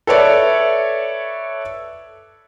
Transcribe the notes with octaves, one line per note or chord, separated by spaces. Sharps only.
A4 B4 C#5 D5 E5